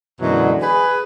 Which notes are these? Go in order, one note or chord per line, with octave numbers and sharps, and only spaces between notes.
F#2 B2 D3 E3 F#3 G#3
G#4 B4